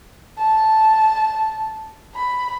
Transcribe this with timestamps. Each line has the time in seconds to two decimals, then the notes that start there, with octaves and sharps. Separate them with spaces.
0.38 A5
2.15 B5